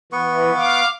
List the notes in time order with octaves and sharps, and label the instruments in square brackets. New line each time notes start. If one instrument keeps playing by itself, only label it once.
[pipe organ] E3 [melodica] B3 B4 C#6
[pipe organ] F5 D6